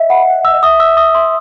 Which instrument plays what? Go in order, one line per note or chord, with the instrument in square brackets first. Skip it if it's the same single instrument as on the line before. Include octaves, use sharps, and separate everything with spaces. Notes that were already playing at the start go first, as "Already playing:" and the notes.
Already playing: [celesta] D#5 E5
[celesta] F#5 [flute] B5
[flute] F#5
[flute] E5 [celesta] E6
[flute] D#5
[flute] E5 [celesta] D#6
[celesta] E6
D#6
C6